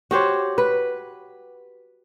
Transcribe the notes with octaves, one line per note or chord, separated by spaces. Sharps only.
F#4 G4 C5 C#5
B4